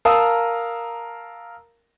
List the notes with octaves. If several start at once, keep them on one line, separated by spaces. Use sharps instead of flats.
A#4 F5 A5 A#5 D#6 E6